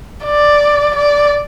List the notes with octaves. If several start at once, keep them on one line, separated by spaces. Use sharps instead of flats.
D5
D5